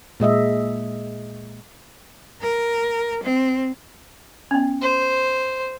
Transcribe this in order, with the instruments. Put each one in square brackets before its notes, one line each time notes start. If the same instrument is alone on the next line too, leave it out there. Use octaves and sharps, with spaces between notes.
[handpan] A#2 G#3 D#5 E5
[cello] A#4
C4
[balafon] B3 C#4
[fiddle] C5